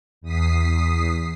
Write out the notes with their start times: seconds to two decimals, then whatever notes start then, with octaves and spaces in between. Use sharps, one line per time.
0.21 E2 D#6 B6 C7